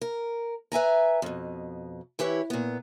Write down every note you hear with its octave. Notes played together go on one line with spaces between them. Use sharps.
A#4
B4 E5 G#5 A#5
F2 B2
E3 E4 G4 B4 C#5
A#2 B3